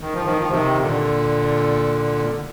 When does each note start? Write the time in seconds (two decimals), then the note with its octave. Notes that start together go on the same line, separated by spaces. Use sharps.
0.01 D#3
0.14 F3
0.26 D#3
0.38 F3
0.50 C3 D#3
0.81 A#2 D3